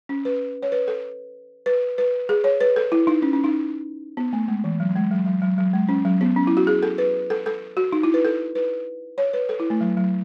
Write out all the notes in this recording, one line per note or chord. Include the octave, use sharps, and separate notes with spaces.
C#4
B4
C#5
B4
A4
B4
B4
G#4
C#5
B4
A4
E4
D#4
C#4
C#4
D#4
B3
A3
G#3
E3
F#3
G#3
F#3
F#3
F#3
F#3
G#3
C#4
F#3
B3
C#4
E4
F#4
G#4
A4
B4
A4
A4
F#4
D#4
E4
B4
A4
B4
C#5
B4
A4
E4
A3
F#3
F#3